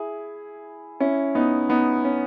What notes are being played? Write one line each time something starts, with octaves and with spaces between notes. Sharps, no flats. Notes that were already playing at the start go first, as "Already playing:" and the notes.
Already playing: E4 G#4
C#4 E4
B3 D#4
B3 D#4
C#4